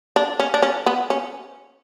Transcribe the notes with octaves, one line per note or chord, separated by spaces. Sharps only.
D4
C#4
D4
C#4
B3
C#4